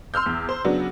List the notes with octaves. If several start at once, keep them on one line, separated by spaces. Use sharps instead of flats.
C6 E6 F6 G6
E2
C5
C#3 F#3 B3 D4